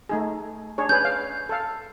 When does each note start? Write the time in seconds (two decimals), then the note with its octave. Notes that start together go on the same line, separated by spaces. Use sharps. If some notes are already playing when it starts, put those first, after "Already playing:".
0.09 A3 D#4 G#4
0.78 D4 G#4 C#5
0.89 C#4 G#4 B4 G6
1.05 F5
1.49 A4 F5